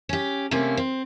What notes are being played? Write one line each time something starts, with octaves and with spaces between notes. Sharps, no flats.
C#4 G4
C3 A3 A#3 C#4
C4